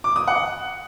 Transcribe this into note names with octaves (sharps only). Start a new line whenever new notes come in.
D6
D#6
F#5